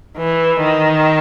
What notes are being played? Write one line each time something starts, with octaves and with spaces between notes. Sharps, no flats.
E3
D#3